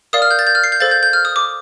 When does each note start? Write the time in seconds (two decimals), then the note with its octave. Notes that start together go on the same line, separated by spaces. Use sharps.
0.13 A#4 D5 F5 D#6
0.22 F6
0.31 G6
0.39 A6
0.47 G6
0.55 F6
0.64 C7
0.72 G6
0.80 A4 C5 F5 A6
0.91 G6
1.03 G6
1.13 F6
1.25 D#6
1.36 D6